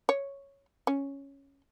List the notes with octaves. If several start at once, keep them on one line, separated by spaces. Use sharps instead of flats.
C#5
C#4